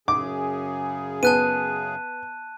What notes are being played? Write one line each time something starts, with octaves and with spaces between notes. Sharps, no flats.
F#2 C#3 G#4 D6
B3 A5 F#6 D#7